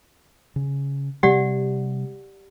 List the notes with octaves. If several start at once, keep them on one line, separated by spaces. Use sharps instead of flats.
C#3
C3 G3 G4 D5 F#5